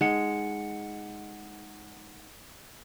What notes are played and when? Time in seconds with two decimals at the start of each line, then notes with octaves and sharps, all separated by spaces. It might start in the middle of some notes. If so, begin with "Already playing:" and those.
0.01 G#3 D#4 F#5 C#7